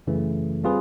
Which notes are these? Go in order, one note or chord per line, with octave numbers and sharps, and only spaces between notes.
F#2 C#3 E3 A3
G3 C4 F4 G#4 B4